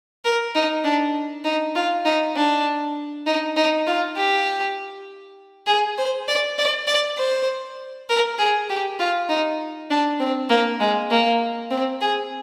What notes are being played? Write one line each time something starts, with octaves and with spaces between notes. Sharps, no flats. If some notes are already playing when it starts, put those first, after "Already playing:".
A#4
D#4
D4
D#4
F4
D#4
D4
D#4
D#4
F4
G4
G#4
C5
D5
D5
D5
C5
A#4
G#4
G4
F4
D#4
D4
C4
A#3
G#3
A#3
C4
G#4